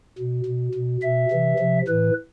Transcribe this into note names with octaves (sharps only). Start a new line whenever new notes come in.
B2
B2
B2
B2 E5
C3 E3
C3 F3
A2 E3 B4